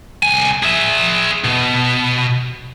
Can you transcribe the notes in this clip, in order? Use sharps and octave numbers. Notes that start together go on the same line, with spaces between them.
C2 G#5
G#4 E5
B2